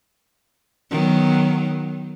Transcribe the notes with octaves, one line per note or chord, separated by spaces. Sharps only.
D#3 F#3 B3